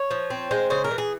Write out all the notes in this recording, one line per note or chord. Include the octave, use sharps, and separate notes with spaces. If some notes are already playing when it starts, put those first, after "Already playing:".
Already playing: C#5
F3
C4
G#3 C5
C#3 C5
A#4
E3
G#4